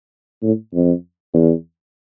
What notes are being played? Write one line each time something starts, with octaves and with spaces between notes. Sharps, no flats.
A2
F2
E2